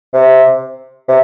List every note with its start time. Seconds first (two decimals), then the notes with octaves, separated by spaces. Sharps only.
0.13 C3
1.08 C3